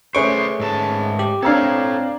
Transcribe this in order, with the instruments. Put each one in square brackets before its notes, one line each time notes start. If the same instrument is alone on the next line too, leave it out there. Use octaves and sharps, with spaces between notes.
[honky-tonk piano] A3 C#4 D7 [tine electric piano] G#4 B4 C#6 [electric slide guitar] C5 D5
[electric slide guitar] G#2 A4 A5
[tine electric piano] G4
[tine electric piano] C4 F5 [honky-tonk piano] D4 A#5 G#6 [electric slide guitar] A4 C#5